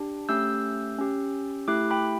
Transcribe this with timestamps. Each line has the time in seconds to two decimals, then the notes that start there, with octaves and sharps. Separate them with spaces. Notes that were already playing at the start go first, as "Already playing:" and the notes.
Already playing: D4 G4
0.29 A3 C#4 G4 E6 G6
0.98 C#4 G4
1.68 A3 E4 G4 D6 F#6
1.91 G5 B5